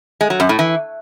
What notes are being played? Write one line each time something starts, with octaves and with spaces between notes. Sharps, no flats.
G#3
F#3
F#2
A2
E3